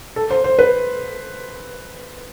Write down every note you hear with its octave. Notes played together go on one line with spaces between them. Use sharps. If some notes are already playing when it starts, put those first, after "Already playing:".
A4
C5
C5
B4